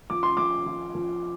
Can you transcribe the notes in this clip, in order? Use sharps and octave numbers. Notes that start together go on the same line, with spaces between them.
F3 D6
C6
F3 D6
F3
F3